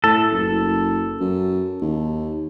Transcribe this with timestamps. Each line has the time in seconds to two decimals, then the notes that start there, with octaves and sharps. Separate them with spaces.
0.04 A2 A4
0.31 F#1
1.21 F#2
1.81 D#2